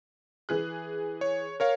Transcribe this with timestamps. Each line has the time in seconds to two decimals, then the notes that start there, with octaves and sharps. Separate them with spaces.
0.49 E3 G#4 F#6
1.21 C#5
1.60 A#4 C#5 F5